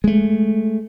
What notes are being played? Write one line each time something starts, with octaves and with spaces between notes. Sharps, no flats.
G#3 A3